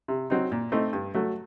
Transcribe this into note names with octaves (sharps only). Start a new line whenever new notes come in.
C3
F#3 C4 D#4
A#2
A3 C4 D#4
G2
F#3 A3